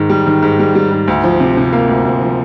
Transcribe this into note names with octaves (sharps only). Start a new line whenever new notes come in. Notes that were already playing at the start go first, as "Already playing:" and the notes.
Already playing: G#2 D#3
G3
D#3
G#2
G3
G3
G#2
D2
F3
C3
C3
A#3
D2
D2
F3